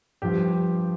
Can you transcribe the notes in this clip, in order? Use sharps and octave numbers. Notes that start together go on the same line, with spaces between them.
G2 F3 G4